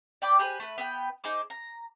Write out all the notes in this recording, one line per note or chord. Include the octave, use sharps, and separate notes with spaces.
D5 G5 B5 D6
G4 G#4 B4 C5
A3 B4
B3 B4 G5
D#4 G#4 C5 D6
A#5